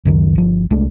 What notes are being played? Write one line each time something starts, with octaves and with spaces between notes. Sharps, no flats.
C#2 F#2 D#3
G1 F3
C2 G#3 A3 D4